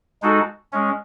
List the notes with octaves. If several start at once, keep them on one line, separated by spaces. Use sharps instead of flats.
G#3 D#4 F#4 A4
G#3 C#4